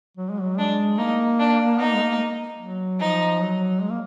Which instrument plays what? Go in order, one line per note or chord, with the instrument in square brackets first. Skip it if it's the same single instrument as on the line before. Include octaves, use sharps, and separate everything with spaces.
[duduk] F#3
G#3
F#3
[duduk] G#3 [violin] D4
[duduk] A#3 [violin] D#4
[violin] D4
[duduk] B3 [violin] D#4
[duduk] A#3
G#3
A#3
F#3
[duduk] F3 [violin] D#4
[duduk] F#3
G#3
A#3